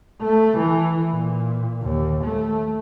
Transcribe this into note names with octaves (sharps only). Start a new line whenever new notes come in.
A3
E3
A#2
D#2
A3